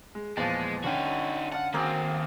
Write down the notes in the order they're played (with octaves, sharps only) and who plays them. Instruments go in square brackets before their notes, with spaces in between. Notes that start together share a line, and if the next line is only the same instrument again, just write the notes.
[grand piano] G#3
[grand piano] E2 A#2 F3 [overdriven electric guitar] G#3 [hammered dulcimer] A5
[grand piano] D3 C#4 G5 [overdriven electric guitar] D#4 F#4
[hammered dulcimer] F5 A5 [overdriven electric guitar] F#5
[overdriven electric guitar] D#3 F#4 [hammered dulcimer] A#3 C4 G#4